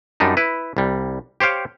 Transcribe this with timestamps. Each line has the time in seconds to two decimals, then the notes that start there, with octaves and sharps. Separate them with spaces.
0.20 F#2 G3 D4 D#4
0.37 E4 B4
0.77 C2 G3
1.40 G4 C5 C#5 F5 G5